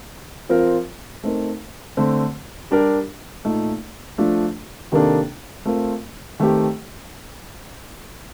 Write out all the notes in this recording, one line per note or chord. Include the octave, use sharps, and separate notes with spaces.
F3 C4 F4 A#4
A3 C4 D#4 A#4
D3 A3 C4
G3 D4 G4 A#4
A#2 A3 D#4
F3 A3 D4
C3 D#3 A#3 D4 A4
A3 C4 F4 A#4
D#3 A3 C4 G4